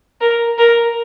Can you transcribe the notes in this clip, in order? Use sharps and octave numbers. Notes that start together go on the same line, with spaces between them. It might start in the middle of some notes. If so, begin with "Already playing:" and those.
A#4
A#4